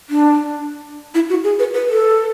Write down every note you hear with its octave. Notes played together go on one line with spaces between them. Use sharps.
D4
E4
F#4
G#4
B4
B4
A4